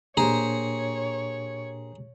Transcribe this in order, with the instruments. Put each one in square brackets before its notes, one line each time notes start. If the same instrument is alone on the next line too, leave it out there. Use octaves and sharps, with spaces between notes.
[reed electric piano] A#2 D4 [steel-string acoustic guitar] A#3 G4 C5 [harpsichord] G#4 A#5 [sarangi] C#5